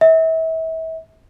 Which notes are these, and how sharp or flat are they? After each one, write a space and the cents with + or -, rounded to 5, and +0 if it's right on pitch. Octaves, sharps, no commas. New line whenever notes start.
E5 -35